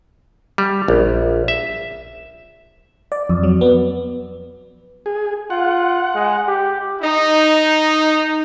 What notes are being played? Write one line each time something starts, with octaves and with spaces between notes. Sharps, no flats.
G3
A#1
E5
D5
F2
F#3
B3
G#4
F4 F#5
G#3
G4
D#4